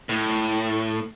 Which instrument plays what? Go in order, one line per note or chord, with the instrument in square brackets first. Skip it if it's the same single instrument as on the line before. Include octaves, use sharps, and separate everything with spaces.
[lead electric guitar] A2